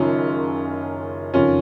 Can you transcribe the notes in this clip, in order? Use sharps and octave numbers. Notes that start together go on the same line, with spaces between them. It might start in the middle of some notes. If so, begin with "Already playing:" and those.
Already playing: F#1 F#2 D#3 C#4 F4
F#1 F2 D#3 C#4 F4